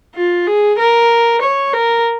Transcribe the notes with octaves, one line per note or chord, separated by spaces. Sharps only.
F4
G#4
A#4
C#5
A#4